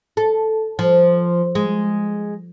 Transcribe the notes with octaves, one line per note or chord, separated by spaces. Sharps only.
A4
F3
G#3